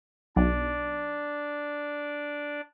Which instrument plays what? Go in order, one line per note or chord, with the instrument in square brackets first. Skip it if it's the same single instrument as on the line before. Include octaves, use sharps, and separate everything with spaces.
[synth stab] B1 [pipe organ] D4 D5